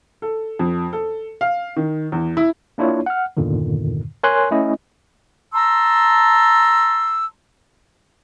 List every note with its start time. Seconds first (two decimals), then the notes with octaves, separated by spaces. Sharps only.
0.22 A4
0.59 F2
0.93 A4
1.41 F5
1.76 D#3
2.12 E2
2.37 E4
2.78 A#3 D4 E4 F4 C#5
3.06 F#5 F6
3.37 E2 G2 A#2 D3 D#3
4.23 A#4 C#5 G#5 C6 F#6
4.51 A3 C#4 E4 D#5
5.52 A5 A#5 C6 E6